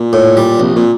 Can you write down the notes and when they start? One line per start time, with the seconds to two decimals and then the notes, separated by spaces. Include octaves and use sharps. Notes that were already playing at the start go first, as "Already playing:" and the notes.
Already playing: A#2
0.13 A2
0.37 G3
0.60 A#1 C3
0.76 A#2